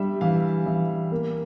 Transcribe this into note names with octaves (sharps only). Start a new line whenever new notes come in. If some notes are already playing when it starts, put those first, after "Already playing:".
Already playing: G3 D4 E5
E3 F5
E3 E5
A#3